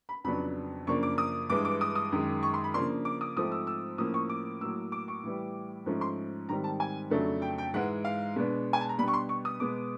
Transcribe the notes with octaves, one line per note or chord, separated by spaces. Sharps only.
B5
F2 C#3 F#3 B3 D4 B5
F#2 C#3 F3 A#3 D4 C#6
D6
D#6
G2 E3 G#3 D6
D6
D#6
D#6
F#2 D#3 G#3
C#6
C6
B5
C#3 F3 A#3 D4 C6
D6
D#6
G#2 F3 A3 C4 D#6
E6
E6
A2 F3 A#3 C#4 D#6
C#6
D6
A2 F#3 A#3 E6
D6
C#6
A2 E3 G3
G#2 F3 A3 C#4
C6
G#2 D#3 G3 C4 A#5
A5
G#5
F2 C#3 F#3 A3 D4
G5
G5
G#2 E3 G#3 F#5
F5
B2 G#3 B3 D4
G#5
A5
A#5
B2 G3 B3 D4 B5
C#6
C6
C#6
D#6
B2 G#3 B3 D6